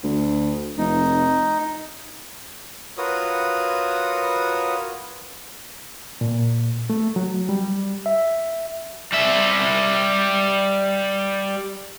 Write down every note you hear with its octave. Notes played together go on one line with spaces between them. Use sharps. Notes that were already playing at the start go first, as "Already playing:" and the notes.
D2
F1 D#4
F4 F#4 A#4 B4 C#5 D#6
A#2
A3
F#3
G3
E5
G3 E5